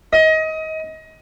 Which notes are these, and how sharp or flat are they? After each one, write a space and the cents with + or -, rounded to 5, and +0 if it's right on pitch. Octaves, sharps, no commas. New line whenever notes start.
D#5 +25